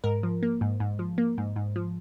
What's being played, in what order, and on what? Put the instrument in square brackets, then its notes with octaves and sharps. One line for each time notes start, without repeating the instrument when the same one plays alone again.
[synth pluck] G#2 A#4
F3
A#3
G#2
G#2
F3
A#3
G#2
G#2
F3